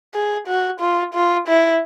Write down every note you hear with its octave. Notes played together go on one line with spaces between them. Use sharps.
G#4
F#4
F4
F4
E4